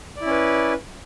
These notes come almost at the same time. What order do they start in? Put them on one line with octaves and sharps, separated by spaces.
D5 E4 C#4 B4